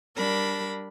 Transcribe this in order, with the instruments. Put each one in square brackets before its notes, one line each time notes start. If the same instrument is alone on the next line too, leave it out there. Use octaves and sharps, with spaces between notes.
[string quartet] G3 D4 A#4 B5 A#6